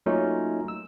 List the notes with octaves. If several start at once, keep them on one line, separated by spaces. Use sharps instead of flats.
F#3 A3 A#3 C#4 D#4 F4
E6